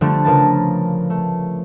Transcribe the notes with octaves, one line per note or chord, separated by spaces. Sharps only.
D3 F3 G3 A3
C#3 F3 A#4 B4 A5
A3